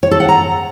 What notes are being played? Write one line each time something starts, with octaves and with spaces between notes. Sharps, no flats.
C#5
A4
F#5
A#5